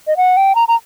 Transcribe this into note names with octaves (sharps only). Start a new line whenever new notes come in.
D#5
F#5
G5
A#5
A#5